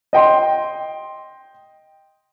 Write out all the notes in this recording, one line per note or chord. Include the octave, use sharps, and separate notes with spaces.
D#5 G5 C6